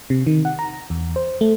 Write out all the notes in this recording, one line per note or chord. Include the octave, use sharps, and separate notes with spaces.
C3
D#3
F#5
A#5
E2
C5
A3